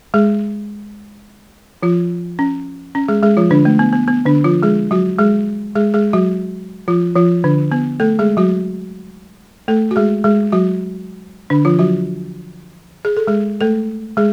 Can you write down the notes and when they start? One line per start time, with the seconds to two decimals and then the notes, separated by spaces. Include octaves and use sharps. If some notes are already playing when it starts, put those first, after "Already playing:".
0.14 G#3 G#4
1.83 F3 F4
2.39 C#4
2.95 C#4
3.08 G#3 G#4
3.23 G#3 G#4
3.37 F3 F4
3.51 D3 D4
3.65 A3
3.79 B3
3.93 B3
4.08 B3
4.26 D3 D4
4.44 F3 F4
4.63 G#3 G#4
4.91 F#3 F#4
5.19 G#3 G#4
5.75 G#3 G#4
5.94 G#3 G#4
6.13 F#3 F#4
6.88 F3 F4
7.15 F3 F4
7.44 D3 D4
7.72 B3
8.00 A3 A4
8.19 G#3 G#4
8.37 F#3 F#4
9.68 A3 A4
9.91 F#4
9.96 G#3 G#4
10.24 G#3 G#4
10.52 F#3 F#4
11.50 D3 D4
11.65 F3 F4
11.79 F#3 F#4
13.05 G#4
13.17 A4
13.27 G#3 G#4
13.61 A3 A4
14.17 G#3 G#4